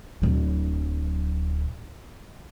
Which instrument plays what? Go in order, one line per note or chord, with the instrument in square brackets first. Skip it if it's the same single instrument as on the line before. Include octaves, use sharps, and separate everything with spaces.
[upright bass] D1 F#3